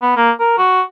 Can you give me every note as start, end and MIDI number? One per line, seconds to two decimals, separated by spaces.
0.02 0.13 59
0.17 0.31 58
0.40 0.56 70
0.58 0.81 66